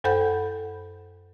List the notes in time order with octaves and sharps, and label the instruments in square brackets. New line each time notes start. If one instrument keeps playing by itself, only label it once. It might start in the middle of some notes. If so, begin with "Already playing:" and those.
[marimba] F#2 A4 C5 F#5 B5 G6